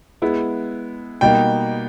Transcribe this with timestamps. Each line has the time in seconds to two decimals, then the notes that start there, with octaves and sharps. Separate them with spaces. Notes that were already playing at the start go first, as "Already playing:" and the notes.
0.22 G#3 B3 E4
1.21 B2 G3 A#3 D#4 G5